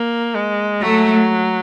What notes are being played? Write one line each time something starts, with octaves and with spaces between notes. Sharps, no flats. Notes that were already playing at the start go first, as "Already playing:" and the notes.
Already playing: A#3
G#3
F#3 A3